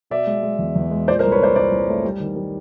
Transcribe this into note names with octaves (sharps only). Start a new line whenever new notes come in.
B2 D5 E5
G#3
G#3
E2
E2
G#3
A#2 C5 D5
A#4 C5
C2
B4 C#5
A#2 C5 D5
A#2 C5 D5
C2
A3
G3
D#3
G3